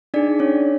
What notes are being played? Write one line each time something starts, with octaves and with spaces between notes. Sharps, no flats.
D4 D#4 G#4 D5
C#4 D4 C#5